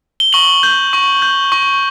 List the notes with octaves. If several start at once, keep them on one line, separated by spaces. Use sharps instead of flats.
G7
C#6 F#7
G6
C#6
G6
C#6